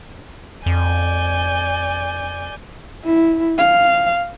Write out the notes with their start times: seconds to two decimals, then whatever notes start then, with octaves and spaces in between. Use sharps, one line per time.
0.66 F2 D5 G#5 G6
3.05 E4
3.58 F5